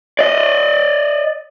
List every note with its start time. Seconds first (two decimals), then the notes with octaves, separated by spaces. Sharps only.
0.19 D5 D#5